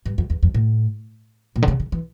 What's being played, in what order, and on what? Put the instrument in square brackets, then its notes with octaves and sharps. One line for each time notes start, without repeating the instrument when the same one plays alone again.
[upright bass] G2
F2
E2
F2
A2
A#2
D3
C#3
D3
E3